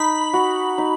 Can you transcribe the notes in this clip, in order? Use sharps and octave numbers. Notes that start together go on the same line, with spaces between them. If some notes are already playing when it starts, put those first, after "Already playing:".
Already playing: D#4 B5
F#4
D#4